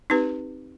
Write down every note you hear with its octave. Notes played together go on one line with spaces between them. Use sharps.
C4 D#4 G4 B4